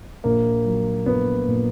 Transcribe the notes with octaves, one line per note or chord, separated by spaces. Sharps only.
A#1 A#3
F#3
A#1 B3
A#2